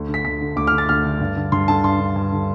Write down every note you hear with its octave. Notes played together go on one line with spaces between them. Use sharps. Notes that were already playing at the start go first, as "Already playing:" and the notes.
Already playing: D2
D3
B6
D2 B6
D3
D2 D6
F6
D3
A6
D2 F6
D3
G2
D3
G2 C6
D3 A5
G2 C6
D3
G2
D3